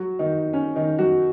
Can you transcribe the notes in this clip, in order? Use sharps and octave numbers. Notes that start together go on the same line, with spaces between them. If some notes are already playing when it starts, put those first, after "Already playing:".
Already playing: F#3 F#4
D#3 D#4
C#4
D#3 D#4
F#3 F#4